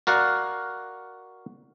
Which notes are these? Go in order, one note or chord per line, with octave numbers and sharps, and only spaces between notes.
F#4 A#4 D5 F5 F#5